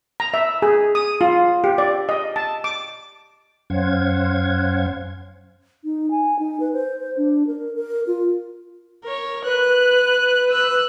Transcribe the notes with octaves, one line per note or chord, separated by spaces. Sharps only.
A#5
E5
G#4
D#6
F4
G4
D5
D#5
A5
D6
F#2 C#4 C5 F5 F#5 G#6
D#4
G#5
D#4
B4
C5
C5
D4
A#4
A#4
F4
A#4 C#5
B4 F#6
E6 F#6